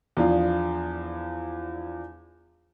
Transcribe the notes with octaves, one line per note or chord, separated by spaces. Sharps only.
E2 F3 D4 F4